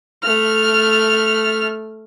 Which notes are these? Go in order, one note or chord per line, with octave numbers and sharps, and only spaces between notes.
A3 F6